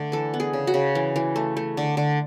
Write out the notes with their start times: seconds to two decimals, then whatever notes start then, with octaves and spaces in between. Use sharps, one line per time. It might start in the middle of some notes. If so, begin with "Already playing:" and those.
Already playing: D3 A3
0.12 E3 A4
0.34 B3
0.40 G#4
0.53 C#3
0.67 F#4
0.74 C#3
0.95 E3
1.16 E3
1.36 A3
1.57 A3
1.77 D3
1.97 D3